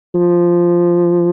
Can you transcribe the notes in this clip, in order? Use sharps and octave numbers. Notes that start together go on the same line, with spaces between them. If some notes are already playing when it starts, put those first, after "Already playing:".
F3